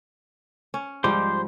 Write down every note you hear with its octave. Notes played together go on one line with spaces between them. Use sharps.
C#4
G#2 F3 G3 C5 C6 D6